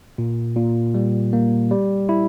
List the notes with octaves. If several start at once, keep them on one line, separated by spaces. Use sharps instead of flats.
A#2
A#2
G3
A#3
G3
E4